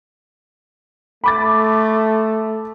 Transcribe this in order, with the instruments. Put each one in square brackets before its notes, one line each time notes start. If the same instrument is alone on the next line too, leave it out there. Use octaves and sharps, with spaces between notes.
[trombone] A3 [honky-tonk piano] B5 D6 A6